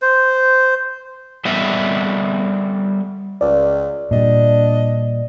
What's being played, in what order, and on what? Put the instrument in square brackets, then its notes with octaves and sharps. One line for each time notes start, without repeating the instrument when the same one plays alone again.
[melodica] C5
[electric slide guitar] G3 B3 A4 D#5 E5
[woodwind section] C#2 [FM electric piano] D5
[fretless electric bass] A#2 G3 [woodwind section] D4 D#5